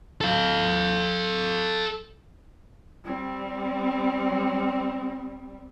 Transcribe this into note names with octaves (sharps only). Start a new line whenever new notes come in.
A4 F5
G3 C4